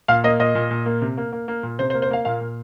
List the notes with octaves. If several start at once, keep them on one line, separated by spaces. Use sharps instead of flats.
A#2 F5
A#3 D#5
A#2 D#5
A#2
A#2
A#3
C3
A#3
A#3
A#3
A#2
C3 C5
C5
A#3
C5
A#3 F5
A#2 F5
A#2